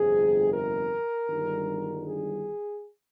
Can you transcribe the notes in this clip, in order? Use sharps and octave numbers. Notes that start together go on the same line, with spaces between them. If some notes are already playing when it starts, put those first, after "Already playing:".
Already playing: G1 F2 C3 G#4
A#4
G1 G2 D#3 G#3
G#4